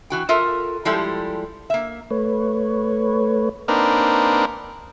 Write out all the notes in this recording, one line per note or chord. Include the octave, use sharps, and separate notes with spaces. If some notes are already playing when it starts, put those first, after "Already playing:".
E3 F#4 G5
F4 A4 A#4 E5
F3 G3 G#3 E4 G4 A4
A#3 E5
A3 B4 C#5
A#3 C4 D4 D#4 A#4 B4